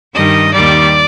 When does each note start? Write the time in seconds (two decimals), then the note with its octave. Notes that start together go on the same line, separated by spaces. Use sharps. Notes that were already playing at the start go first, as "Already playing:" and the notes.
0.14 G2 D#3 G3 D#5
0.52 D#2 D#3 G3 D5